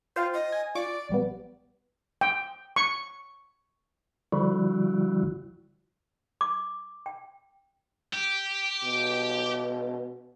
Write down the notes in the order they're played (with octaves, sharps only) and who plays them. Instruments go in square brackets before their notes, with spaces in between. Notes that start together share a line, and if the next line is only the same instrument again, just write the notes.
[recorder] F4 [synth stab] C5 F5 G5
[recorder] D#5
[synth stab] G#5
[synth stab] F4 C#6 D6 [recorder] D5
[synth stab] A#1 G3 B3
[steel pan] G5
C#6
[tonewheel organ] D3 F3 G3 E4 F#4
[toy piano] D6
G5
[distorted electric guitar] G4
[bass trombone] B2